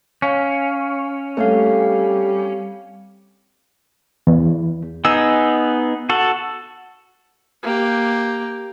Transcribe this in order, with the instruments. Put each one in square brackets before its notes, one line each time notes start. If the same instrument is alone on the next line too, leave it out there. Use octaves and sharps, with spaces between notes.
[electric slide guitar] C#4 [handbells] C#5 F5
[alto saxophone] G3 [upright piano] A3 [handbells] C4 C#5 F5
[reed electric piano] E2
[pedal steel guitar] B3 D#4 G#4 [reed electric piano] E6
[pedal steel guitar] F#4 A4
[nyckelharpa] A#3 G4